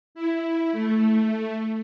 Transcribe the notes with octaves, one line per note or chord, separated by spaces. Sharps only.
E4
A3